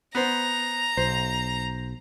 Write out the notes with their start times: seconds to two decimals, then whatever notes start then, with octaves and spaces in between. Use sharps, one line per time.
0.15 B3 C5 A#5
0.97 B1 C5